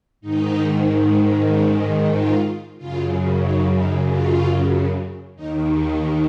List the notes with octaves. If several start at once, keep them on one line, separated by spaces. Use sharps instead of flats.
G#2 D#3 D#4
C#4
F4
F#2 C#3 F4
D#4
D#4
F4
D#2 D#3 D#4